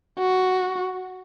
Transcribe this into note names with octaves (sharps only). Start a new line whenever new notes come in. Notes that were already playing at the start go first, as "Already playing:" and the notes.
F#4